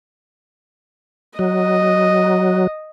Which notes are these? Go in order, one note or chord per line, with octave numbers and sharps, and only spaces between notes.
F#3 D#5